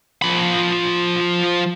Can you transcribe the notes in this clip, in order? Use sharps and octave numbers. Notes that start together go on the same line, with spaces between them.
F3 B5